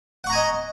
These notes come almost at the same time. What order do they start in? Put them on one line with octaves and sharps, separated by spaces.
F#5 C#6 A#5 G#5 D#5